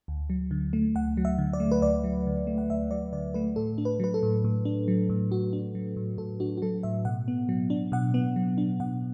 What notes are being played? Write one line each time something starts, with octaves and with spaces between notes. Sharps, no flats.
D2
F#3
D3
A3
D2 F#5
F#3
E5
D3
D5
A3
B4
D2 D5
F#3
D3
A3
F#5
D2 E5
F#3 D5
D3 D5
A3 B4
A2 A4
D4
B4
F#3 B4
A4
A2
A2
D4
F#3
A2
A2 F#4
D4
F#3
A2
A2 A4
D4 F#4
F#4
F#3 A4
A2 E5
B2 F#5
B3
F#3
D4
B2 F#5
B3
F#3
D4
B2 F#5